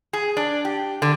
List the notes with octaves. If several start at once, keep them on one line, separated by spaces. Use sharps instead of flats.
G#4
D4
G4
D3